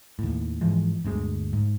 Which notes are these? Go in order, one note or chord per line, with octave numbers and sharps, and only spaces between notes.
D#2 A2
G#2 E3 F3 G#3
G1 D2 A#2 G#3
G#2